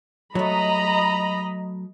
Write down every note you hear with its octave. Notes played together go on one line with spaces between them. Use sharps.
F#3 A3 D#5 A#5 B5